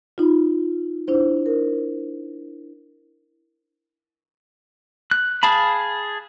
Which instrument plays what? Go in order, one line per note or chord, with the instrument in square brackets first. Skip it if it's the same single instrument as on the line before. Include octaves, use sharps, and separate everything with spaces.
[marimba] D#4 F4
D4 E4 C5
A#4
[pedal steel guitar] F#6
G#4 F5 A5 B5